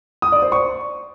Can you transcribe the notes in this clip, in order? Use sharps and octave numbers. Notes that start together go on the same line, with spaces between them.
D#6
D5
C5
C#6